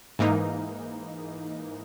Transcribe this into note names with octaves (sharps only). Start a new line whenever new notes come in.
G#2 E3 A#3 D#4